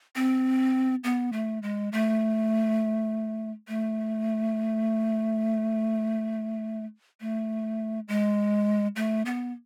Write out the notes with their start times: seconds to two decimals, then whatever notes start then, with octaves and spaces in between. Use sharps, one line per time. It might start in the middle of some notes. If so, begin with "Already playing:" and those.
0.16 C4
1.04 B3
1.33 A3
1.63 G#3
1.92 A3
3.68 A3
7.21 A3
8.08 G#3
8.96 A3
9.26 B3